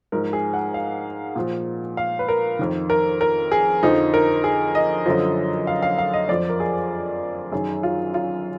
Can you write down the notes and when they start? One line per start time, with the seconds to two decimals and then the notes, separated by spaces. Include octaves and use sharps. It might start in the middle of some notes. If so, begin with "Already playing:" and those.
0.12 G#2 F3 A#4
0.33 G#4
0.53 F#5
0.74 F5
1.36 A#2 F3
1.97 F5
2.19 B4
2.28 A#4
2.59 F2 D#3
2.90 A#4
3.21 A#4
3.52 G#4
3.83 F2 D3 F3 D#4
4.14 A#4
4.44 G#4
4.75 D#5
5.06 F#2 D3 F3
5.67 F5
5.83 F5
5.98 F5
6.13 D#5
6.29 F2 F3 D5
6.49 A#4
6.60 G#4
7.52 F#2 D#3 G#4
7.83 F4
8.14 F4